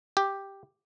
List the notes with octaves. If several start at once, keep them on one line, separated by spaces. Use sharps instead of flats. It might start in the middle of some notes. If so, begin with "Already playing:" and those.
G4